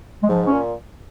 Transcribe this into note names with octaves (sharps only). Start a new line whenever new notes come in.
G#3
G#2 F3
C#4
A#2